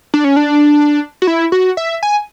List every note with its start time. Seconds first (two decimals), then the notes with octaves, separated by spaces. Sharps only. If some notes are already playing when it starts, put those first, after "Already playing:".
0.14 D4
0.24 C#4
0.36 D4
1.22 F#4
1.27 E4
1.52 F#4
1.77 E5
2.03 G#5